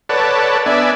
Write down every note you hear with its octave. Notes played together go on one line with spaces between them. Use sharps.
A4 B4 C#5 D5 F#5 A5
B3 D4 D5 E5 G#5